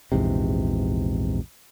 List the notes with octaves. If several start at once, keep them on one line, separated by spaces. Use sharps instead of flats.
A#1 E2 G#2 C3